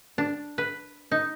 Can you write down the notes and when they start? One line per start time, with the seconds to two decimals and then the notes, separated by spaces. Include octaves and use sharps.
0.18 D4
0.58 B4
1.12 D#4